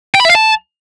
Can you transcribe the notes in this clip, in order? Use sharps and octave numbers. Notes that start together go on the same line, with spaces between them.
G5
B5
E5
F5
A5